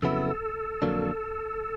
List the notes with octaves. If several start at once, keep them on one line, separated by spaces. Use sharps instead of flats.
F2 C#3 F#3 B3 E4 A4
F2 D3 F#3 A#3 D4